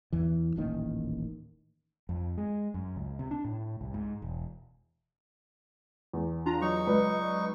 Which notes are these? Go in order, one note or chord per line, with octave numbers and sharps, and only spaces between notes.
E2 E3
D#1 A1 D#3 A#3
F2
G#3
F#2
C#2
C3
D4
A2
C2
G#2
E1
E2
D4 F4 A#5
F#3 D#4 C#6
C#2 B4 D5